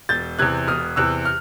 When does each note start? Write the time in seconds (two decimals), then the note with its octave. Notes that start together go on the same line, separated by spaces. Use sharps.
0.09 E1 G6 A6
0.39 E2 C3 F#6 G#6
0.67 E1 D#6 F6
0.96 E2 C3 E6 F#6
1.25 F6